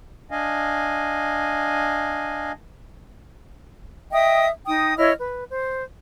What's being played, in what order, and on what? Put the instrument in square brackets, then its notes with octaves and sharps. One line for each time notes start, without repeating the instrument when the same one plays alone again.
[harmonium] D4 D#5 F5 G#5
[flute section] D#5 E5 G5 D#6
D#4 G5 D#6
E4 C#5 D#5 F6
B4
C5